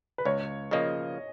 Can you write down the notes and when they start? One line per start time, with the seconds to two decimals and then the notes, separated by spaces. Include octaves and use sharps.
0.18 B4
0.25 C#2 C#5
0.71 C#3 F3 A#3 D#5